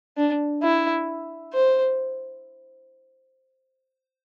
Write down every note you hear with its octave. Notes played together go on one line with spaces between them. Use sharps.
D4
E4
C5